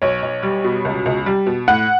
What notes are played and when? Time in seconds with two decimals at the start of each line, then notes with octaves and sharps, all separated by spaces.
0.02 B1 C#5
0.22 B1
0.43 G3
0.64 B2
0.85 C#2
1.06 C#2
1.26 G3
1.47 B2
1.68 A2 F#5